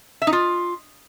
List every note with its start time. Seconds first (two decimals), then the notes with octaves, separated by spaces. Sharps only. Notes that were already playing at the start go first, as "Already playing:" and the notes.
0.22 E5
0.27 D#4
0.33 F4